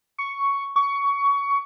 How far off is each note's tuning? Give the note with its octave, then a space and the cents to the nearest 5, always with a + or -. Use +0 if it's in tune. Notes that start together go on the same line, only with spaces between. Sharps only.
C#6 +5
C#6 +20